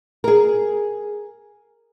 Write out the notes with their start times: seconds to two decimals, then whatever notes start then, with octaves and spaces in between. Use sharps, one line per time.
0.24 G#4 A#4